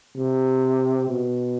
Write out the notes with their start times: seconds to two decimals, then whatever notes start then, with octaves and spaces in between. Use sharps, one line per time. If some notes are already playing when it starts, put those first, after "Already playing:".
0.17 C3
1.08 B2